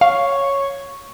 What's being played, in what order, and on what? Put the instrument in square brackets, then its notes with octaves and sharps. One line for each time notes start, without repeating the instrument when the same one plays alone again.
[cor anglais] C#5 [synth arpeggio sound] F5